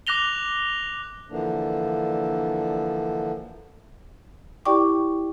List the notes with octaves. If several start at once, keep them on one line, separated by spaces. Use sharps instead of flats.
D6 F#6 A#6 F7 G7
D3 E3 F3 A#3 D4
E4 G4 D5 G5 C#6 D6